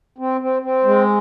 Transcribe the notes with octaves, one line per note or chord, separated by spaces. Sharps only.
C4
C4
C4
G#3